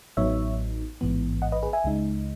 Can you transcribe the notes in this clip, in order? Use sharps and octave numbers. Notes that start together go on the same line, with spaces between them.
A1 A2 F#3 B3 D#4 C#5 E5
A1 G#2 E3 B3
D#5 F#5
B4 D#5
G#4 B4
E5 G#5
C#2 C#3 G#3 D#4